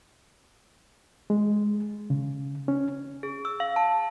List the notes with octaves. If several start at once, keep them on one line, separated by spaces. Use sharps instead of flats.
G#3
C#3
C#4
G#4
E6
F5
A5